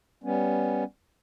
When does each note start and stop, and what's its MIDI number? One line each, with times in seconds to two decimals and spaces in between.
0.24 0.84 55
0.24 0.84 59
0.24 0.84 61